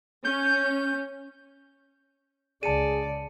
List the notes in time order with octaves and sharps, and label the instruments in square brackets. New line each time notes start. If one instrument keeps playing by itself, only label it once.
[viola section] C#4 [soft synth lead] G6
[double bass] C#2 C#3 [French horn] G#4 [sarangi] D5 [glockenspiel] A5 C#7 D#7